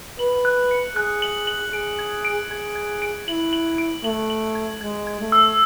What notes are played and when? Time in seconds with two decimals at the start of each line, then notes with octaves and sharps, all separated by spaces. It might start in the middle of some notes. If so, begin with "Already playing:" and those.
0.19 B4 F#7
0.45 F#6
0.71 C#7
0.96 G#4 F#6
1.22 F#7
1.47 F#7
1.73 G#4 D7
1.99 G#6
2.25 D7
2.50 G#4 G#6
2.76 G#6
3.02 D7
3.27 E4 F#7
3.53 F#7
3.78 D7
4.04 A3 F#7
4.30 F#7
4.55 G#6
4.81 G#3 G#6
5.07 G#6
5.21 A3
5.32 E6